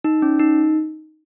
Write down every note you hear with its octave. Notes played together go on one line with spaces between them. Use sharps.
D#4
C#4
D#4